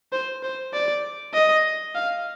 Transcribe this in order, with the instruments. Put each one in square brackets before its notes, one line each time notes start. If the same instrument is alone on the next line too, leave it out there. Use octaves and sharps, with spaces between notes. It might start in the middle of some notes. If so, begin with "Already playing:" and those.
[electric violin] C5
C5
D5
D#5
F5